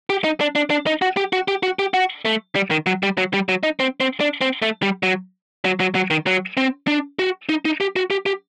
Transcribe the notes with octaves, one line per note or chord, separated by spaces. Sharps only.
G4
D#4
D4
D4
D4
D#4
F#4
G4
F#4
G4
F#4
G4
F#4
A3
G3
D#3
F#3
G3
F#3
G3
F#3
D#4
C4
C4
D4
C4
A3
G3
F#3
F#3
F#3
F#3
D#3
F#3
C4
D4
F#4
D#4
D#4
G4
F#4
G4
G4